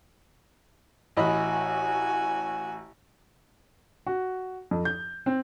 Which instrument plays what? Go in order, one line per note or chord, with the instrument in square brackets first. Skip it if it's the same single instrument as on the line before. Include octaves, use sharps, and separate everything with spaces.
[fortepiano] A1 D#5 B5 [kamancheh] F#4 G#5
[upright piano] F#4
F2
G6
C4